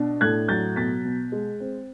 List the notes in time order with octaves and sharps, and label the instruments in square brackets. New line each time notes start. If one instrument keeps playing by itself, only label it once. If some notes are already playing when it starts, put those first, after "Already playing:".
Already playing: [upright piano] B2 D4
A2 F#6 G#6
F#3 G6 A6
B2 A6 B6
B2
G#3
C4